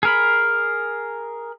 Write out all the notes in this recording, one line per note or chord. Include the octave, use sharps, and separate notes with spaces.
G#4 A#4 B5